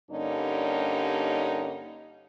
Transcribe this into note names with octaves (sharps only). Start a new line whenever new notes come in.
G2 D3 G3 A#3 C#4 D#4